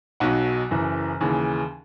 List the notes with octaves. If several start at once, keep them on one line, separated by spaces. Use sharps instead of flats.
B1 B2 F#3 F#5
F#1 F#2 E3
D#2 C#3 E3